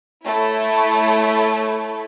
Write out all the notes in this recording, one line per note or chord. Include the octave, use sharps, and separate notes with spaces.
A3 E4 C#5